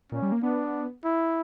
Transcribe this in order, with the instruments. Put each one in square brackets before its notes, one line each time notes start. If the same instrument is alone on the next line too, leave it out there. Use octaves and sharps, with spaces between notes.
[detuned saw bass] A#2 [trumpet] C#4
[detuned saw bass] G3
A#3
[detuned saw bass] B3 [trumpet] D4
[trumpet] E4